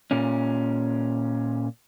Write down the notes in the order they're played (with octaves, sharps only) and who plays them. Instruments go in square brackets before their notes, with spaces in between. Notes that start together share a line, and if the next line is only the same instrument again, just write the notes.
[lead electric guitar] A#2 C#4